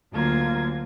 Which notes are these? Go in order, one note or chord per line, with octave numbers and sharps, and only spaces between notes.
D2 D3 F#3 A#3 F4 G#6